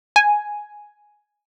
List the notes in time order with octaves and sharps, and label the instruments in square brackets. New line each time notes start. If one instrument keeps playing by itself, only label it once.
[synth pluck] G#5